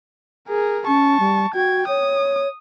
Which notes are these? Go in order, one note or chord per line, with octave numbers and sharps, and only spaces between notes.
G#4 A#4
C#4 A5 C#6
G3
F#4 G5 G#6
C#5 D#6